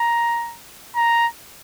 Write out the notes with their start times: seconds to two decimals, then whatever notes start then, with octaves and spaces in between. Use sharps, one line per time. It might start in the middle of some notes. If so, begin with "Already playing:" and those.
Already playing: A#5
0.96 A#5